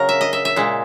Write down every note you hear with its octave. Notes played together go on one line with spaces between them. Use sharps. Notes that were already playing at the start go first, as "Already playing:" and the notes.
Already playing: C#3 F#3 A#3 A#4
E5
D#5
E5
E5
A#2 G#3